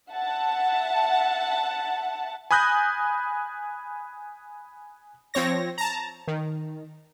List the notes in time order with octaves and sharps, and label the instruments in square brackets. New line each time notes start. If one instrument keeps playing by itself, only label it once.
[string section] E5 F#5 A5
[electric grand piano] G#5 B5 D#6 F#6 G6 A#6
[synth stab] F3 C4 C#5 A#6
A5 A#5
D#3